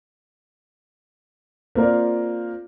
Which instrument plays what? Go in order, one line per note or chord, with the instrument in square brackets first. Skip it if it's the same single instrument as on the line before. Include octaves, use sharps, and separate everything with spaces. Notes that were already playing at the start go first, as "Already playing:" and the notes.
[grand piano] A#3 C4 F4 A#4 D5